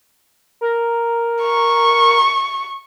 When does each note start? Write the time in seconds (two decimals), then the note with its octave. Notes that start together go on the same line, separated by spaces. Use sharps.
0.61 A#4
1.42 C#6